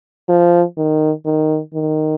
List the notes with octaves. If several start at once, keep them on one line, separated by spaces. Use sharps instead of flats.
F3
D#3
D#3
D#3